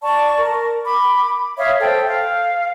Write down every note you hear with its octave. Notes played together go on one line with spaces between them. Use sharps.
D5 A5 C#6
A#4
B5 D6
C#5 E5 F5 D#6
A4 C5 G5
F5